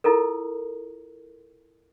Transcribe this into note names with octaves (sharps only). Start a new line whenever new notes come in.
E4 F4 A4 A#4